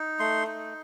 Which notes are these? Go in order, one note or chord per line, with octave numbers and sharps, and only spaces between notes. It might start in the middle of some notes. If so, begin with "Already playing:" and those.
Already playing: D#4
A3 C6
D#4